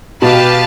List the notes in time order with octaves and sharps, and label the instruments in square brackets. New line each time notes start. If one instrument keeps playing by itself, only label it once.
[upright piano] B2 [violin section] G4 B4 F5 A5